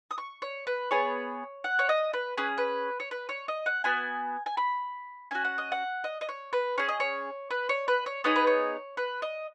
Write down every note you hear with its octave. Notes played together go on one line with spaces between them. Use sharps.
D#6
C#6
C#5
B4
B3 G#4 C#5
F#5
C#5
D#5
B4
C#4 G#4 B4
B4
C#5
B4
C#5
D#5
F#5
B3 F#4 G#5
G#5
B5
C#4 F#4 G#5
F#5
D#5
F#5
D#5
D#5
C#5
B4
C#4 G#4 C#5
D#5
C#5
B4
C#5
B4
C#5
B3 D#4 G#4 C#5
B4
C#5
B4
D#5